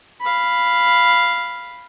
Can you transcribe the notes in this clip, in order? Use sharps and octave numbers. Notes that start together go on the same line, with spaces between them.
F5 B5